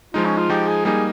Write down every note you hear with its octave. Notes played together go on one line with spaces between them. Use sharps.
F3 G#3 D#4 F4
C#4
F4
F3 G#3 D#4 G4
G#4
G3 A#3 D#4 G#4